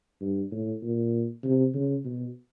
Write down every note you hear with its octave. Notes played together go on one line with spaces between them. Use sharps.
G2
A2
A#2
C3
C#3
B2